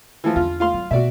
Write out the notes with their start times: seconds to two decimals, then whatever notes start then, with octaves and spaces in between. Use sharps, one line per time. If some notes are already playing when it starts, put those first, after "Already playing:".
0.24 E3 F3
0.36 E2 D3 F4
0.60 F4 F5 C6
0.74 F#3
0.91 B2 F#4 D5 E5